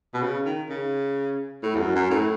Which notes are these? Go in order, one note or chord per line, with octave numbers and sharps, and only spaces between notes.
B2
C#3
D#3
C#3
A2
E2
F#2
F#2
A2